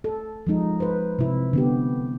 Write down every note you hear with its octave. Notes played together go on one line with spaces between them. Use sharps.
A4
F3 G#3 D#4
B4 C5
C3 E4
D3 B3 G4